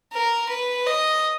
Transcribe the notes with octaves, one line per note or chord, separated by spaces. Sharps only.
A#4
B4
D#5